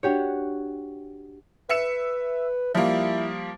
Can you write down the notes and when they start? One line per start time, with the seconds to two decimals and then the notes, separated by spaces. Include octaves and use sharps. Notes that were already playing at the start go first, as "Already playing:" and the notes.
0.03 D4 F#4 G4 C#5
1.69 B4 E5 C#7 E7
2.75 F3 G3 A#3 E4